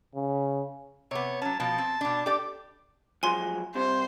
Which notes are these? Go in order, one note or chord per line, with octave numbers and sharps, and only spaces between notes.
C#3
C3 B3 C#5
F#3 C#4 A5
B2 F3 A5
C4
B2 D4
G4 A4 D5
F3 F#3 G#3 G#5 C6
C2 C3 C5